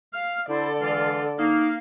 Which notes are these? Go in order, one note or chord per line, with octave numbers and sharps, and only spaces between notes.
F5 F6
D3 E4 A4 C5 D5
E3 G#3 F4
A#3 D#4 F5